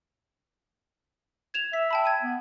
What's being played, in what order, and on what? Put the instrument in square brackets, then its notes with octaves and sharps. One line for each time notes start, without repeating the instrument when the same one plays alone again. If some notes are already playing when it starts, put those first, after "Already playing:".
[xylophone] G#6 E7 F7
[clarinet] E5 [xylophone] B6
[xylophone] G5 A5 B5
G#6 D#7
[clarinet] B3